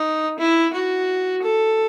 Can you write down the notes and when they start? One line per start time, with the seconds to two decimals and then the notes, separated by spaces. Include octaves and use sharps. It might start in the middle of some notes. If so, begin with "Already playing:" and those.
Already playing: D#4
0.39 E4
0.73 F#4
1.42 A4